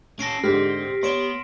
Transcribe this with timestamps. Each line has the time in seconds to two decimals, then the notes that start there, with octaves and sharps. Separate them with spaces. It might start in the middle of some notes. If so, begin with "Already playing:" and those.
0.19 C#4 A4 A#6 C7 D7
0.44 G#2 D3 C4 G4 F6 B6
1.03 B3 C#5 C6 D7 E7